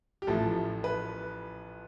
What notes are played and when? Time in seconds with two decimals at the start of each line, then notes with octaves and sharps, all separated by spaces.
0.22 G4
0.27 A1 A2 F3 A4
0.84 B4